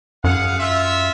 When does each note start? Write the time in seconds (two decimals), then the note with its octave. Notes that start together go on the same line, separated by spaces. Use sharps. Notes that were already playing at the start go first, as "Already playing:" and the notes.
0.24 F#2 G#4 F5 F#5
0.58 F4 E5